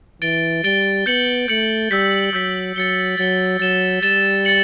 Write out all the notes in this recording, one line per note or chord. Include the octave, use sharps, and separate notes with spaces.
E3 A6 D7 G7
G3 A6 D7 G7
B3 G6 C#7 F#7
A3 G6 C#7 F#7
G3 E6 G6 B6
F#3 E6 G6 B6
F#3 A6 C#7 G7
F#3 A6 C#7 G7
F#3 A6 E7 G7
G3 A6 E7 G7
A6 C#7 F#7